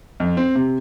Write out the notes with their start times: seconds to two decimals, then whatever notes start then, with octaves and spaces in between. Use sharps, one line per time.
0.20 F2
0.37 C4
0.55 C3